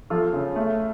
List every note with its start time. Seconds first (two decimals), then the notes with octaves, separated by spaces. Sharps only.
0.10 F3 F4 A4
0.33 C#3
0.56 A3